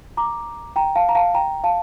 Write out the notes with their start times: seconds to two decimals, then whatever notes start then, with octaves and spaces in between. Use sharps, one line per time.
0.17 A#5 D6
0.76 G5 A#5
0.96 F5 A5
1.09 A#5
1.15 F5 A5
1.34 G5 A#5
1.64 F5 A5